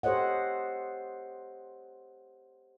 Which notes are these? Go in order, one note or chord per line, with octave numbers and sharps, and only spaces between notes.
G4 A4 C5 C#5 D#5 F#5